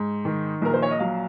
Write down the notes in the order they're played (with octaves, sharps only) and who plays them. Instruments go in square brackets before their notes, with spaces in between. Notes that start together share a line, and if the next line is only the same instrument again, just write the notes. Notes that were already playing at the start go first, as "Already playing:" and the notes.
Already playing: [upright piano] G#2
D#3
A#1 A#4
C5
C#5
D#5
F#3 F5